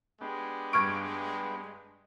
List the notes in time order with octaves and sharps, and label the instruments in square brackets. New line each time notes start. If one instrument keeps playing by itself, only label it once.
[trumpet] G#3 [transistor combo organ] B3 D4 G4
[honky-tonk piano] G2 D7 [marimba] C#6 F6 G#6